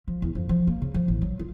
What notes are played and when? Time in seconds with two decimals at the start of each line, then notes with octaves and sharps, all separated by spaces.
0.08 F3
0.22 E2
0.35 F2
0.49 F3
0.67 A#3
0.82 C#3
0.94 F3
1.08 A1
1.22 F#3
1.39 F4